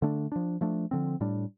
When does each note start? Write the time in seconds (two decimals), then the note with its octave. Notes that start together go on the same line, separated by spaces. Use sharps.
0.02 D3 A3 D4
0.32 F3 D4
0.61 F3 A3 D4
0.91 D3 F3 C4
1.20 A2 G3 D4